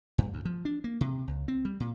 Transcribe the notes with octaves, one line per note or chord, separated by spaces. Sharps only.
G2
D2
F3
D4
A#3
C3
C#2
C4
G3
A#2